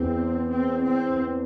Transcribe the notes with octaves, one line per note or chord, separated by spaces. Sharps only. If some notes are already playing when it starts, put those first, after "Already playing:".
Already playing: E2 C4
C4
C4